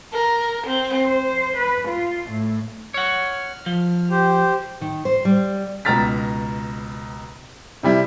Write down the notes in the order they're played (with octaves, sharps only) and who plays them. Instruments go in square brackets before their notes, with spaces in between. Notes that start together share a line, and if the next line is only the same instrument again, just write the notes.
[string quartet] A#4
C4
C5
B4
F4
A2
[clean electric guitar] C#5 F#5 [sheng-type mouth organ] F6
[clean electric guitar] F3
[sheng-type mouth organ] G4 C5
[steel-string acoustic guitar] D#3
C5
G3
[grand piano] C#2 B2 A#5 F6 A6 B6
C3 G3 E4